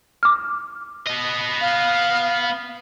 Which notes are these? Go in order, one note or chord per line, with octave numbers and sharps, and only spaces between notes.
D6 F6
B3 D#5
F5